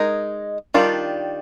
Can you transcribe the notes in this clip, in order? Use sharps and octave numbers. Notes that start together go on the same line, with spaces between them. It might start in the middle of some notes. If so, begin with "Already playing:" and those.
Already playing: G#3 D#4 A#4 D#5
D#3 G3 D4 F4